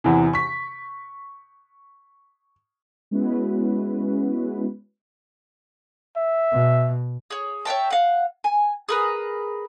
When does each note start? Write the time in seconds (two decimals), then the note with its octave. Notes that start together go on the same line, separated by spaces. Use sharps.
0.04 E2 C3 E3
0.33 C#6 B6
3.11 G#3 B3 C#4 E4 F#4 B4
6.17 E5
6.52 B2
7.30 G#4 C#5
7.65 C#5 E5 G5 A5
7.90 F5 F#5
8.44 G#5
8.89 G#4 A#4 B4